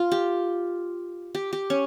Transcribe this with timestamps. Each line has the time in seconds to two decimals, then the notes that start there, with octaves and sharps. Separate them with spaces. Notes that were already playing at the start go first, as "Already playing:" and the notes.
Already playing: F4
0.12 G4
1.35 G4
1.53 G4
1.70 C#4